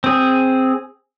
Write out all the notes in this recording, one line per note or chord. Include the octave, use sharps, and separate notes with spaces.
C4 G#4